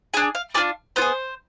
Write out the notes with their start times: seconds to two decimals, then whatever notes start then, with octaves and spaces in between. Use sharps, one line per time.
0.14 D4 G#4 G#5
0.35 F5
0.55 D4 F4 G#4 D5
0.96 B3 F4 C5
1.02 G#4